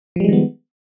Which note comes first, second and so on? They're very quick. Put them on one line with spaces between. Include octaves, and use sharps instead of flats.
F3 G3 G#3 D#3 B3